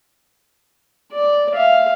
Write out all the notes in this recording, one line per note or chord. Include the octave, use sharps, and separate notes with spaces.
D5
E5 F5